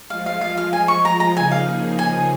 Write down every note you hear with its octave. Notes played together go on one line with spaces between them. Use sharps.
F3 G#3 F4 F5
F5
F5
F5
G#5
C#6
A#5
A#5
C#3 F3 A#3 D#4 G#4 G#5
F5
G#5